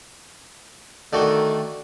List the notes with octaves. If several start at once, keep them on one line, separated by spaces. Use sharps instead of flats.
D3 D#3 A3 F#4 G5